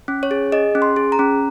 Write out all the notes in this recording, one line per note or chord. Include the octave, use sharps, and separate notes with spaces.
C#4
C#5
G#4
G#4 D#5
C#4
C6
G#4
A#5
C#4